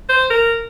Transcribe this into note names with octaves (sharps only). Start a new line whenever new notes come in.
C5
A#4